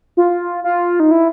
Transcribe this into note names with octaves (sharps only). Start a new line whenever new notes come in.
F4
F4
D#4
E4